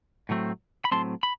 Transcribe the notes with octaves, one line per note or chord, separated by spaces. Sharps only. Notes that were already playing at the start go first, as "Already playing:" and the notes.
A2 F#3 A3 C4
B5
A2 F#3 A3 C4 A5 C6
B5